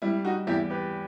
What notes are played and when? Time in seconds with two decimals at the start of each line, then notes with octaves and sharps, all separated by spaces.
0.02 G3 E4
0.25 D#4 F#4
0.47 E2 E4 G4
0.70 G4 B4